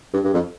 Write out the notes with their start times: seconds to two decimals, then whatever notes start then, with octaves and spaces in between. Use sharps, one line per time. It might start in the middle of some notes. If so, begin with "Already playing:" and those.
0.14 G2
0.24 G2
0.34 F2